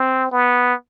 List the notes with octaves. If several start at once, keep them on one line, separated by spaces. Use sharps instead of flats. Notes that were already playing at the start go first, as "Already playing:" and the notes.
Already playing: C4
B3